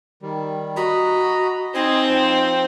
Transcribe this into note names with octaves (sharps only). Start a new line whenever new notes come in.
D#3 G3
F#4 D#5 A#5 B5
C4 D#4 D#5 G#5 C6
F3 C5 G5